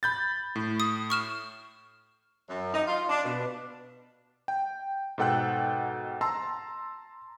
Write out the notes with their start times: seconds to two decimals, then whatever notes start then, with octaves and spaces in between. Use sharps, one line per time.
0.03 B5 G6 A6
0.55 A2
0.80 D#6
1.10 C#6 F6 E7
2.49 F#2
2.73 D#4
2.87 F4
3.09 D4
3.25 B2
4.48 G5
5.18 G#2 B2 A4 F#5 G5 F#6
6.21 A5 A#5 C6 E6